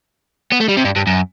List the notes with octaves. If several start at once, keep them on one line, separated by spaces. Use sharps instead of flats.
B3
A3
G3
C3
G2
G2
F#2